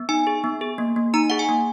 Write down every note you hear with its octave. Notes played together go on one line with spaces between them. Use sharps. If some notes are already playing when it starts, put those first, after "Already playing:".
Already playing: B3
D#4 G#5
G#4
B3
G#4
A#3
A#3
D#4 A#5
G#4 F#5
G#5
A#3